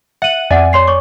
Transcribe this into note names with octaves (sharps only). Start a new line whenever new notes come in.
E5 F#5 D#7 F#7
F2 D5 E5 F#5 G#5
C#5 C6 C7
C#5 C#6 D6